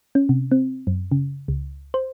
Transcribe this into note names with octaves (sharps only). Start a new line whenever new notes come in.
C#4
C3
C4
F#2
C#3
C#2
C5